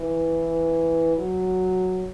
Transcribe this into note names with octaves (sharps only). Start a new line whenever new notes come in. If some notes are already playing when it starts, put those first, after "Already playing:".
Already playing: E3
F#3